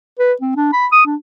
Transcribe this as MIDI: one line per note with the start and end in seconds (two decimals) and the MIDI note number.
0.19 0.33 71
0.41 0.54 60
0.56 0.72 62
0.72 0.87 83
0.92 1.02 87
1.06 1.16 62